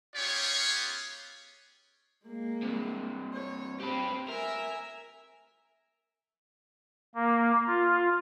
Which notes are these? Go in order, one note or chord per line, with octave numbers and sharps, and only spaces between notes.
B3 C#4 F4 G4 G#4 C#5
G#3 A#3
G2 C3
C#5
C4 G4 B4
A#4 E5 G#5
A#3
F4